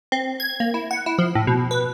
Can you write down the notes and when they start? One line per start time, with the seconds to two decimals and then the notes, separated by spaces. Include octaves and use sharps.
0.12 C4
0.40 G#6
0.60 A#3
0.74 E4
0.91 F#5
1.06 E4
1.18 F3
1.35 A2
1.47 B2
1.71 B4